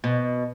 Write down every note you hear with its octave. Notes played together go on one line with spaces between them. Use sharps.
B2